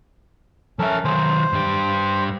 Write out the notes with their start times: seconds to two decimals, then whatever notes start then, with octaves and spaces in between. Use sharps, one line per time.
0.79 F3 C#4 A4 A#4 E5
1.05 D#3 F#3 C5
1.53 G2 G4